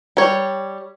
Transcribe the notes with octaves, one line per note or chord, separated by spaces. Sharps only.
G3 C#5